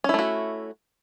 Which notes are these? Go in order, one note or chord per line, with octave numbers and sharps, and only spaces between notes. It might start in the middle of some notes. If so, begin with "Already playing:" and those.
A3 C#4 E4 F#4